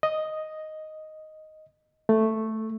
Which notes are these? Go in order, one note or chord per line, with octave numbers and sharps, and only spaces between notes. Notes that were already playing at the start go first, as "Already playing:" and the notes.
D#5
A3